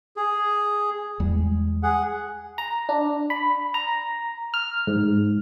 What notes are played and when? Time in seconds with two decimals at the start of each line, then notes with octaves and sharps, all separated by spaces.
0.17 G#4
1.20 E2 G3 G#3
1.83 G#4 F#5
2.58 A#5
2.89 D4
3.30 B5
3.74 A#5
4.54 F6
4.87 G#2